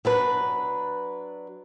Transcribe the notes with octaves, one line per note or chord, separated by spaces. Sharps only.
F#3 D4 B4